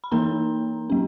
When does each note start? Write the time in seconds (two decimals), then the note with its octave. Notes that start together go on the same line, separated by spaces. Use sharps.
0.04 B5
0.11 E3 A#3 D#4 A#4 A#5
0.90 F#3 A#3 C#4